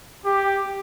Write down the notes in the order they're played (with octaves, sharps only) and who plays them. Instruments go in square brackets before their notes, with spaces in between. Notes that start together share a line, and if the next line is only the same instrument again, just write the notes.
[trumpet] G4